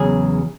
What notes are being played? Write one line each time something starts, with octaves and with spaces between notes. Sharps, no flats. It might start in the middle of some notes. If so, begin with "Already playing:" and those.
Already playing: E2 C#3 F#3 G#4